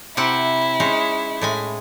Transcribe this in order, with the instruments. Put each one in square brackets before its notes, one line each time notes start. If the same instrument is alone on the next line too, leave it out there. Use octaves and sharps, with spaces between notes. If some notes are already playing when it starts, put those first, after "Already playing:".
[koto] C3 C4 F#5 [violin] E4
[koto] G#3 C#4 D#4
A2 G#3 G#5